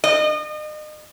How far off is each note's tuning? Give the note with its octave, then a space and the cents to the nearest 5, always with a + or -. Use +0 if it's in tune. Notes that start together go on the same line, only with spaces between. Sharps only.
D#5 -35